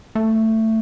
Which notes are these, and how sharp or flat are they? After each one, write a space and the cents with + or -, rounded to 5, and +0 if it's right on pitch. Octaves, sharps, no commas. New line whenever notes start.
A3 +15